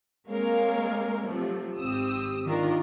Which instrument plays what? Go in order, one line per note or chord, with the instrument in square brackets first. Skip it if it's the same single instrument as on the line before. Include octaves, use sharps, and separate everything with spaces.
[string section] G#3 A#3 C4 A#4 C#5 F5
C3 F3 F#3 A3
G#1 C4 G4 D#6 E6
D#3 D4 F4 A#4